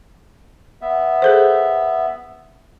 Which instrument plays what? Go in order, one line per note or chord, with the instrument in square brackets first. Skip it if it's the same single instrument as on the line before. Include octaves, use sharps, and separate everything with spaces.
[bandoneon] B3 E5
[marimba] G#4 A4 C5